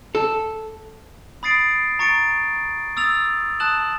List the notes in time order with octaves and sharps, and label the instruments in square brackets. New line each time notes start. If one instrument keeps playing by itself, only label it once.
[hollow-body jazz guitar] A4
[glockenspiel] B5 D#6 A6 C7 D7
A#5 C#6 A6 C#7 D7
D#6 E6 A6 F7
A5 D#6 F#6 E7 F#7